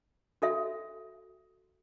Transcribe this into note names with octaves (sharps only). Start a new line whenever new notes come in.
F#4 A4 E5